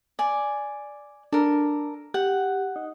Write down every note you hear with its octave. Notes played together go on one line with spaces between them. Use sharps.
D5 G#5
D4 A4 A#4
G4 F#5
D#4